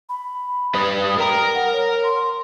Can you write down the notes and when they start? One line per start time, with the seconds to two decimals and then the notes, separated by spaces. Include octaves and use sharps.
0.09 B5
0.75 G3 B4 D#6
1.18 A#4 G5 A#5
1.54 F#5
1.73 C#5
2.03 C6